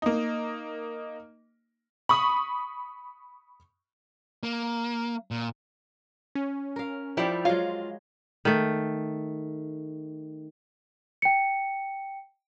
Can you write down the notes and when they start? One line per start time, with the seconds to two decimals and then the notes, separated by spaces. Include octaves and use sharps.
0.02 A#3 D#4
2.09 B5 C#6 D#6
4.43 A#3
5.31 A#2
6.35 C#4
6.76 A#4 F5
7.17 F3 G3 E4 G4 C5 D5
7.45 F#3 G#3 F4 F5
8.45 D#3 A3
11.22 G5 C#7